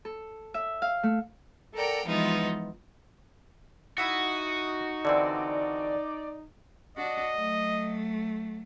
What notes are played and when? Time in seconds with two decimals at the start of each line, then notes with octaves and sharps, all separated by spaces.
0.05 A4
0.54 E5
0.82 F5
1.03 A3
1.74 A4 A#4 D5 F#5 G5 A#5
2.05 E3 F3 G#3 B3 D#4 F4
3.98 D#4 E4 F#4 E5 F#5 D#6
5.05 D3 E3 C4 D5
6.97 D4 F#4 D#5
7.35 F#3 A3